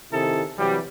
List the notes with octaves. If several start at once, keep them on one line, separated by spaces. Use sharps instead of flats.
C3 D#3 E4 G#4 A4
C3 E3 F#3 G3